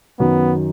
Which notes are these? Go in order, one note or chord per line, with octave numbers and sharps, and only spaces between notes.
F#2 D#3 F#3 B3